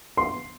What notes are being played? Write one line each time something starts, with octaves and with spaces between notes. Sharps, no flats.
C6